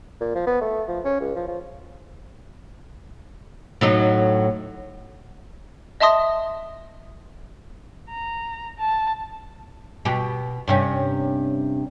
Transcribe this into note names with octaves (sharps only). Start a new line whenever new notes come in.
A#2
F3
B3
A3
F3
C#4
C#2
F3
F3
A2 F#3 D#4
D#5 E5 A5 C6 D#6 A#6
A#5
A5
B2 G4
G2 C3 C#4